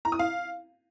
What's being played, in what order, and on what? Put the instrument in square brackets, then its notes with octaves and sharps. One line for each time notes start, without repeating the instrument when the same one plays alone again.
[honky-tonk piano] A#5
D#6
F5